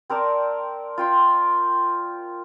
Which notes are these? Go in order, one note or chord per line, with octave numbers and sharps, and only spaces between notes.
C4 A#4 D5 A5
F4 G5 C6